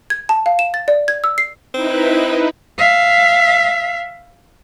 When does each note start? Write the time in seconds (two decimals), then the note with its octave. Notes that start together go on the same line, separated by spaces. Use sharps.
0.10 G#6
0.29 A5
0.46 F5
0.59 E7
0.74 A6
0.88 D5
1.08 G#6
1.24 E6
1.38 C7
1.74 C4 D#4 E4 B4
2.78 E5 F5